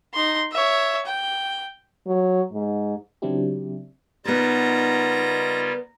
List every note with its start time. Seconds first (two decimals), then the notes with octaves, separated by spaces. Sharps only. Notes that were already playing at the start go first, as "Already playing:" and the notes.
0.14 D#4 C6
0.52 C#5 E5
1.06 G5
2.07 F#3
2.53 G#2
3.22 C#3 F#3 C4 D4 E4 G4
4.25 C#3 G3 B3 D#4 F4 A#4 A#5